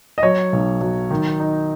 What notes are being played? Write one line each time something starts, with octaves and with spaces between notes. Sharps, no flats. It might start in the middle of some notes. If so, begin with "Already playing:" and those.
D#5
F#3 C#5
B1
F#3
D#3
D#4